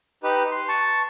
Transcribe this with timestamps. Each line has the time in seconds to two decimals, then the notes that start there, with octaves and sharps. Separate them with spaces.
0.23 D#4 G4 B4
0.51 C6
0.69 A5 C#6